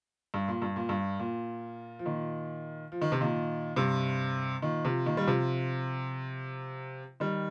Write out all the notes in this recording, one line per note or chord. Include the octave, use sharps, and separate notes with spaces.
G2
A#2
G2
A#2
G2
A#2
F3
A#2 D#3
F3
D#3
C3
A#2 D#3
G2 C3
A#2 D#3
C3 F3
A#2 D#3
G3
C3 F3
D#3 G3